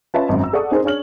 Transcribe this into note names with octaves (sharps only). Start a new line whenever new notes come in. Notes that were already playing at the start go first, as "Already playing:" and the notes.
C#4 F4 B4 D#5 E5 A5
G#1 F#2
A#5 E6
G#4 A4 D5 F#5 C#6 D#6
C4 D#4 G#4 A#4 C5
D4 G#4 C#5 F6 F#7